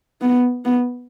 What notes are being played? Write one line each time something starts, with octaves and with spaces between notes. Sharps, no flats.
B3
B3